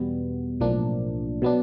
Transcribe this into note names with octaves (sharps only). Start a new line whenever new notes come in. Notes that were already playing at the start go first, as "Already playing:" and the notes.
Already playing: E2 B2 G3 B3
B1 A2 F3 A#3 D4
B2 F#3 B3 D4